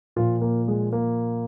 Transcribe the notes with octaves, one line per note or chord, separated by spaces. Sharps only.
A#2 F3 F4
A#3
G#3
A#3